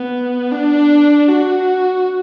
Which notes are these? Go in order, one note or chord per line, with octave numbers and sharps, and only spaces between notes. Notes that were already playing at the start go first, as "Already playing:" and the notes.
Already playing: B3
D4
F#4